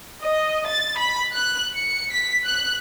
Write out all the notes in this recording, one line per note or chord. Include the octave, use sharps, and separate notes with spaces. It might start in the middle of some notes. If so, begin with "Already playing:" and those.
D#5
A6
B5
F#6
C#7
B6
F#6